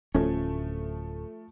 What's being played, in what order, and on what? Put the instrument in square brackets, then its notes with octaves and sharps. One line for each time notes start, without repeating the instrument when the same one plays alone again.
[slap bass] D1 C#4 [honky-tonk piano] F3 A3